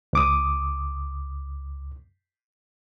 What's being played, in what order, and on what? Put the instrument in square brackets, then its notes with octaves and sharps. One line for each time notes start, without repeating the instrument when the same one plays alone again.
[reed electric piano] C#2 D6 D#6